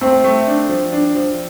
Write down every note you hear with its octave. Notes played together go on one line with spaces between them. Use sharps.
A3 C4
A3
D4
F3
D4
F3